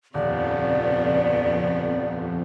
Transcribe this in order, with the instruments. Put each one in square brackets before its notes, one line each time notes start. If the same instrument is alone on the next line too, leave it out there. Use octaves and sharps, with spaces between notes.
[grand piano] D#1 [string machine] F2 [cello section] C#3 B3 [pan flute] D5